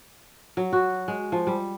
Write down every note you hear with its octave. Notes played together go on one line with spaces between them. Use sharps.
F#3
F#4
G#3
F3
G3